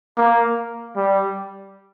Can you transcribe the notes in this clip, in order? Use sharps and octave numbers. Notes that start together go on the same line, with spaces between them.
A#3
G3